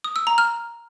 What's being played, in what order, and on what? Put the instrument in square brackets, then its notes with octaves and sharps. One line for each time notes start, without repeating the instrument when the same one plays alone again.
[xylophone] D#6
E6
A#5
F6